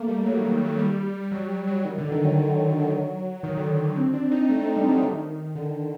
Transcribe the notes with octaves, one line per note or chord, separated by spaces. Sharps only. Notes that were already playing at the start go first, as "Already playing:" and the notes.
Already playing: A3 A#3
G3
F#3
D#3
D#3
F#3
G3
G3
F#3
G3
F#3
D#3
D3
D#3
F#3
D#3
D3
D#3
D#3
C4
D4
D#4
A3
A3
G3
F#3
D#3
D3